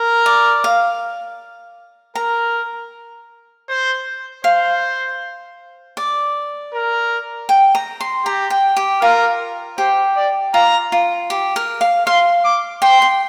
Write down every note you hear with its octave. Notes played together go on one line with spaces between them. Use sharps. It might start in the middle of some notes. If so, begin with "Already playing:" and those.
Already playing: A#4
D5
F5
A#4 A#5
C5
C5 F5
D5
A#4
G5
A#5
C6
G4 A#5
G5
G4
F4 A#4
G4 C5
D5
F4 A#5
F4
G4
A#4
F5
F5 C6
D6
G5 C6
G5